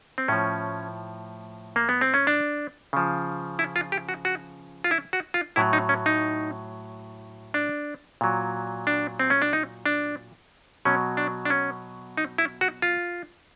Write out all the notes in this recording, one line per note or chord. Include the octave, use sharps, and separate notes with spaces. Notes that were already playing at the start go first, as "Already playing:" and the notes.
C4
A2 F3 C#4
A#3
B3
C4
C#4
D4
C#3 F3
E4
F4
G4
F#4
F#4
F4
E4
F#4
F4
A2 F#3 E4
D#4
C#4
D#4
D4
A#2 F#3
D4
C4
C#4
D4
D#4
D4
B2 F#3 C#4
D4
D4
C#4
D#4
E4
F#4
F4